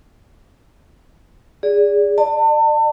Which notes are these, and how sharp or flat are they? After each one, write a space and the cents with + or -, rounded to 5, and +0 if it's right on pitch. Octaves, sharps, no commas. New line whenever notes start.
G#4 -20 D5 -20
D5 +35 A5 +35